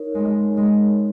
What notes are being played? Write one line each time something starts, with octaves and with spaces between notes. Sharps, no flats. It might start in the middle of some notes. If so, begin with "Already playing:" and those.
Already playing: D#4 A#4 C#5
G#3
G#3